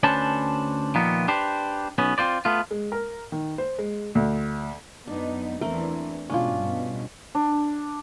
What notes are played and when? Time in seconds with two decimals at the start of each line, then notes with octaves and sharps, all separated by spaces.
0.03 D2 C#4 D4 B4 C5 A5
0.95 A#2 D#3 F3 B3
1.28 D4 G4 B4 C5
1.98 B1 B3 C#4
2.18 C4 F4 C5 D5
2.45 A3 B3 F4
2.71 G#3
2.92 A#4
3.32 D#3
3.58 C5
3.79 G#3
4.15 D2
5.08 F#2 B3 D4 D#4
5.61 E2 E3 A3 C4 D4 A#4
6.30 G#2 B2 C#4 D4 F4
6.60 G2 B2
7.35 D4